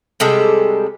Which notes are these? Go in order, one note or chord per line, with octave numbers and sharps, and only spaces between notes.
C3 G3 G#3 A4